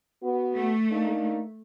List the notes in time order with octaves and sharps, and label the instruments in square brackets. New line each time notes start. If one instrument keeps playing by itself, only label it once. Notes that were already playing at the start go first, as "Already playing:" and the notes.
[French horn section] B3 F#4
[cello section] A3
[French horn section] A#3 D4 D#4